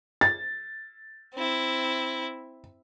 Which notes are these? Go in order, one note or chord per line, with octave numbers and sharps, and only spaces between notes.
A6
C4 E4